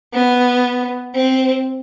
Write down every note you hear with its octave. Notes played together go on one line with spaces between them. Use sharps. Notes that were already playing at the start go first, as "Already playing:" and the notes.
B3
C4